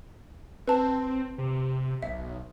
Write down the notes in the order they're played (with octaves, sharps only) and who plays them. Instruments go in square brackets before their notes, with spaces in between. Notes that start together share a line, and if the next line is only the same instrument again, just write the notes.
[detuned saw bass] C4 [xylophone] B4 A5
[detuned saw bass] C3
[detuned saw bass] B1 [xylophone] E5